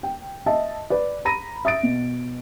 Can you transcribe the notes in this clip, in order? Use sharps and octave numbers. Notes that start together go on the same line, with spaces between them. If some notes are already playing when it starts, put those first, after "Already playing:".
G5
D#5 E5 A5
B4 D5
A#5 B5 A#6 D#7
E5 D#6 A6 D7
B2